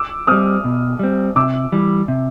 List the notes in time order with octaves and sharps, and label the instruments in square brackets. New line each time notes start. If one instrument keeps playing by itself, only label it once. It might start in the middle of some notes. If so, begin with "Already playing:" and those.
Already playing: [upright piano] D6 E6
[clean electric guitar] G3 C4 [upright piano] D#6 F6
[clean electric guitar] B2
G3 C4
[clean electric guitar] C3 [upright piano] D6 E6
[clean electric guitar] E3 G3
C3